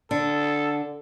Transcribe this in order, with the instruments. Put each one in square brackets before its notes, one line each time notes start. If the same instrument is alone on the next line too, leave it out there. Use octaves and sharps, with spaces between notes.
[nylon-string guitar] D3 [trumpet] A4